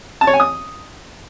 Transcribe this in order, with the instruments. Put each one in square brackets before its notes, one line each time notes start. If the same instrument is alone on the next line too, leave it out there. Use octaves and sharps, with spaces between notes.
[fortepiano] A5
C#5
G#5
D#6